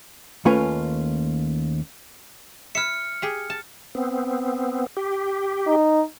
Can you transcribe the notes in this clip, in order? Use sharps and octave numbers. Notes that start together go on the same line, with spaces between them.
D#2 A3 C#4 F4 B4 G#5
E4 E5 F6 C#7
G4 G#4
A5
B3 C4
G4
D#4